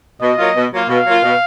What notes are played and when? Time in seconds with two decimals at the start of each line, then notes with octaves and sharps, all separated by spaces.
0.21 B2 D#5
0.38 F#3 A#3 F4
0.55 B2
0.71 F#3 A#3 F4
0.88 B2 F5
1.06 F#3 A#3 F4
1.22 B2